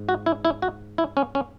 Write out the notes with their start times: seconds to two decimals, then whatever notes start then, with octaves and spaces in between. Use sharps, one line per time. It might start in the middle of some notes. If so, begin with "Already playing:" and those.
Already playing: G#2
0.09 F#4
0.26 E4
0.45 E4
0.62 F#4
0.98 E4
1.17 C#4
1.35 C#4